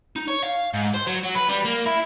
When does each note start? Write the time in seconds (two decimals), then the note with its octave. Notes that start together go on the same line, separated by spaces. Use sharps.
0.16 D#4
0.28 C#5
0.44 F5
0.74 G#2
0.94 C5
1.07 F#3
1.24 F#3
1.35 B4
1.49 G3
1.65 A#3
1.86 E4